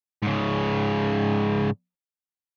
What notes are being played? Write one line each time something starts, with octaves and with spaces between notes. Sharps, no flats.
G#2 C#3